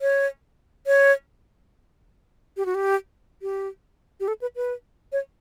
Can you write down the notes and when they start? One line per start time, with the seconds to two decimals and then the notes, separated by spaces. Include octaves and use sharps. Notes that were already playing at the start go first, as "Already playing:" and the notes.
0.01 C#5
0.87 C#5
2.57 G4
2.66 F#4
2.75 G4
3.42 G4
4.20 G4
4.28 A4
4.41 B4
4.56 B4
5.12 C#5